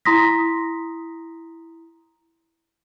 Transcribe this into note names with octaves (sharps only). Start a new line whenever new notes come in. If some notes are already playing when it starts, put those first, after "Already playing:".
E4 A#5 C6 D#6 A#6 B6